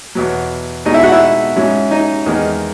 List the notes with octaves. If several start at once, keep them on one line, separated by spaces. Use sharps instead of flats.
E2 B2 F#3
B2 G#3 D#4 D#5
E4 E5
F#4 F#5
E4 E5
G#2 F#3 C#4 E4
D#4 D#5
E2 D#3 G#3 D#4